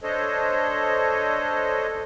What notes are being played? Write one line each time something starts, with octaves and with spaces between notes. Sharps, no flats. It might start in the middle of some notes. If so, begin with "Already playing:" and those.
D4 A4 C5 C#5 D#5